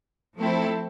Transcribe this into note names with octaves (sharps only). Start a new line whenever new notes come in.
F3 A3 C4 E4 A4